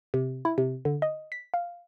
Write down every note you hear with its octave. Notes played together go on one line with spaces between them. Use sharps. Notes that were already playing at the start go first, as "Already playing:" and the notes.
C3
E4
C3
D3
D#5
B6
F5